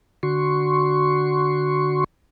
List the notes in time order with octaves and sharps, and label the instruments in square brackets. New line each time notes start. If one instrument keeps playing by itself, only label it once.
[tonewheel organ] D3 F#4 C6 C#6